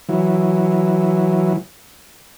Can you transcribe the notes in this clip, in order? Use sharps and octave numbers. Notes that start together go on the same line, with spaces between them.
E3 F#3